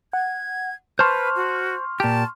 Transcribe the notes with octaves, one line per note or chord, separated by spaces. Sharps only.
F#5 G#6
B4 C5 A5 C6 C#6 F6
F#4
A#2 G4 A5